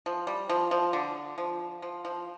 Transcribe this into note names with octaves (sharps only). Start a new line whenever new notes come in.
F3
G3
F3
F3
D3
F3
F3
F3